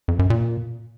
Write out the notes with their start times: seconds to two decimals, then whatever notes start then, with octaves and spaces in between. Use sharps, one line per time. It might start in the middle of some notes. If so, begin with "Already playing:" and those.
0.08 F2
0.19 F#2
0.30 A#2